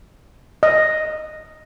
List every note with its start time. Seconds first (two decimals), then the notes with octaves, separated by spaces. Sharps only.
0.63 D#5